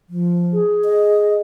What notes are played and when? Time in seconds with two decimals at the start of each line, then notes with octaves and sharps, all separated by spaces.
0.09 F3
0.53 G#4
0.85 D#5